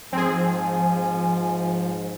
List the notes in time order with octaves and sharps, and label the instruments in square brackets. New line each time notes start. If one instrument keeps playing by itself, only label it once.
[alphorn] G#2 [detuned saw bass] F3 [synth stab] C4 G#4 [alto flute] G#5